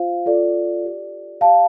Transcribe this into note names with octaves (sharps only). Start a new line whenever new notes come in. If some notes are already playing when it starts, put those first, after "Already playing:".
Already playing: F4 C5 F5
F4 A4 D5
G4 D5
G4 D5 F5 A5